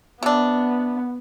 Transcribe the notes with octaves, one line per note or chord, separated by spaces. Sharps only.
C3 B3 D4